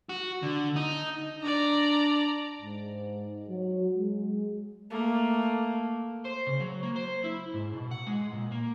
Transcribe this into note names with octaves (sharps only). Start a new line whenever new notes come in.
F#4
D3
D#4
D4 D5 A#5
G#2
F#3
G#3
A3 A#3
C5
C#3
F#3
A#3
C5
E4
G#2
B2
F#5
G#3
A#2
A#3